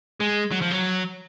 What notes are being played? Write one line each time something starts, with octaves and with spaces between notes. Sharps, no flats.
G#3
F#3
F3
F#3